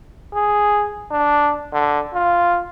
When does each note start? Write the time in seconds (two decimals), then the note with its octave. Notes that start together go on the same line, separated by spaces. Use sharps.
0.34 G#4
1.11 D4
1.73 D3
2.14 F4